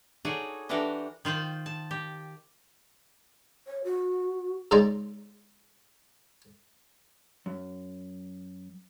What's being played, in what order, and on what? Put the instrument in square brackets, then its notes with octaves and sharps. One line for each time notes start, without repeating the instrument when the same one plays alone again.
[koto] D#4 F#4 G#4 A4 C#5 D5
E3 D4 F#4 G4 A4 A#4
D#3 F4 C5 G5
A5
G4
[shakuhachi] C#5
F#4
[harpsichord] G#2 C#3 D#4 D5 A#5 C6
[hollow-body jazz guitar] F#2